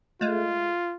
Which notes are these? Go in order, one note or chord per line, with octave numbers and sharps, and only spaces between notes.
G#3 A3 F4